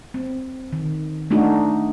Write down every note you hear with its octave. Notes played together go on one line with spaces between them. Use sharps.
C4
D#3
A3 D4 D#4 F#4